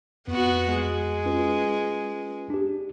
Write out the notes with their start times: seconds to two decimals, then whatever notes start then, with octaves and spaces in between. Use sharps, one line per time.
0.28 F2 B3 F#4
0.74 G#3
1.26 C#4 F4 B4
2.50 D4 G4